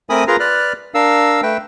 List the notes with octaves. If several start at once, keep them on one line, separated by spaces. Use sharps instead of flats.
A3 C4 A#4 G#5 B5 D#6
F4 G#4 A#4 B4 A#5
B4 D5 F6 F#6
D4 A#4 F5 E6
A3 B4 G5